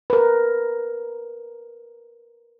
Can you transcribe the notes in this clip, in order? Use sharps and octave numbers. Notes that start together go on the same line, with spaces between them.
A#4 B4